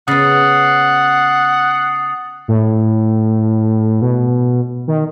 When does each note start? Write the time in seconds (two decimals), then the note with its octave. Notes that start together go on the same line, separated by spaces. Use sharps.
0.08 C#3 B3 F#5 D#6 A6 C7
2.48 A2
4.02 B2
4.88 D#3